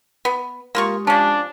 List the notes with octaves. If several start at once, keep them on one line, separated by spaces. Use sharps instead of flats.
B3
G#3 A#3 F4 G4 C#6 D#6
F3 C#4 D4 A5